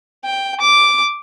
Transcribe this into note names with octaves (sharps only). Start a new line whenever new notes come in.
G5
D6